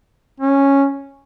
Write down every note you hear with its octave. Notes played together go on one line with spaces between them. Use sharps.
C#4